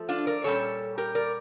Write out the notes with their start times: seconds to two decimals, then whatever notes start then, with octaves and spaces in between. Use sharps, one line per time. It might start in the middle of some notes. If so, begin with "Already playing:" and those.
Already playing: F3 A3
0.09 D4 F4
0.27 A#4 D5
0.44 A#2 G3 C#4 A4 C#5
0.98 G4 A#4
1.15 A#4 D5